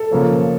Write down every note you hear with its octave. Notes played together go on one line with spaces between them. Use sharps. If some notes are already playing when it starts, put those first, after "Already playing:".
Already playing: A4
C#3 F3 A#3 C#4